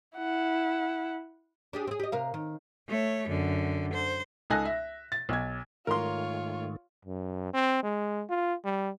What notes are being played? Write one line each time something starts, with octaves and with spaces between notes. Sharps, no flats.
E4 F#5
D4 G4 G#4
C4 G#4
G4 D#5
C3 A#4 F5
D#3
A3 C#5
F#2 D3
C5
C#2 D#4 A4 G#5 F#6 A#6
E5
A6
B1 G#6
G#2 D#3 A3 F4 A#4 C#5 C6
F#2
C4
G#3
F4
G3